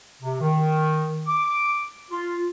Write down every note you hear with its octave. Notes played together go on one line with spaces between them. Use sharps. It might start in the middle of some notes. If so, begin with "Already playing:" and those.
C3
D#3
D6
F4